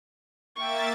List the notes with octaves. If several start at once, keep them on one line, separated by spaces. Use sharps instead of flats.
A#3 E5 G5 C#6 A6